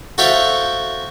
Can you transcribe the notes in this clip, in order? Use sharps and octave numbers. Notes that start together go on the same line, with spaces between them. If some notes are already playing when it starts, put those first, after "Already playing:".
F#4 A4 C5 E5 F5 G5